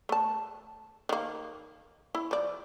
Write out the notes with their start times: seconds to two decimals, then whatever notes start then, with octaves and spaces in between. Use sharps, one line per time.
0.09 A3 A5
1.09 D#3 A#3
2.15 E4
2.31 F3 D5